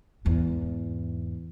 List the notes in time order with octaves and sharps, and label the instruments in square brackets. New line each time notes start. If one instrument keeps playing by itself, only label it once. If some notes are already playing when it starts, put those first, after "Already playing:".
[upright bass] E2 G#2